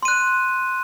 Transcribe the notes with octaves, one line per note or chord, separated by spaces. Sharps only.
C6 F#6 D#7